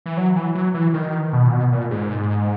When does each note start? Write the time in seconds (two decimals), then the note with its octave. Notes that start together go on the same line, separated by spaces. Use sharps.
0.06 E3
0.17 F#3
0.36 E3
0.55 F#3
0.74 E3
0.94 D#3
1.33 B2
1.47 A#2
1.52 B2
1.72 A#2
1.91 G#2